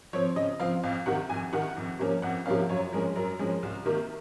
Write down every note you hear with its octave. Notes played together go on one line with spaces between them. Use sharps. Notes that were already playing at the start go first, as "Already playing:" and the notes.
F3 C4 C#5
C#3 D#5
F3 C4 F5
F2 F5
C3 D#3 F#5
F2 G#5
C3 D#3 F#5
F2
C3 F3 A#3 C#4
F2 F#5
C3 F3 A#3 C#4 F5
F#2 C#5
F3 G#3 C#4 A#4
F#2 A#4
F3 G#3 C#4
C2
C3 D#3 A#3